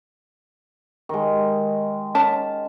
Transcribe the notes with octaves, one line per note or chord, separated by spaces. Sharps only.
D#3 G#3
C#4 A5